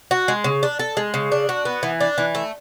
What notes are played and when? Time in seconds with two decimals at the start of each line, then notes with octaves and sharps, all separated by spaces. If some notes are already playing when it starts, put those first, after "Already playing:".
0.11 F#4
0.28 G#3
0.44 C#3
0.63 D4
0.79 A4
0.97 G#3
1.14 C#3
1.32 D4
1.49 F#4
1.65 B3
1.83 E3
2.00 D4
2.18 E3
2.35 A3